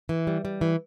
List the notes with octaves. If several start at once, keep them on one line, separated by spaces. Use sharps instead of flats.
E3
G3
G3
E3